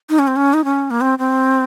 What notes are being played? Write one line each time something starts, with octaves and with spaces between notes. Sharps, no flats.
D#4
C#4
C4
C#4
D#4
C#4
A#3
C4
C4